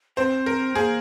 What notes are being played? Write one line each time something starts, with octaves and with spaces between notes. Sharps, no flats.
C4 C5
A#4
A#3 G#4